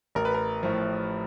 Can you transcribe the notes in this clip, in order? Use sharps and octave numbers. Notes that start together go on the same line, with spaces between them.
A1 A#4
B4
A#4
A2 F3